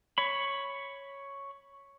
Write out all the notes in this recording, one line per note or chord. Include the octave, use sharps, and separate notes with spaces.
C#5 B5